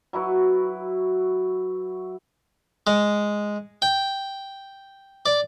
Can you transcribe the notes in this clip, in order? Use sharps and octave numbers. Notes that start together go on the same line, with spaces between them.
F#3 E4 F#4 B4
G#3
G5
D5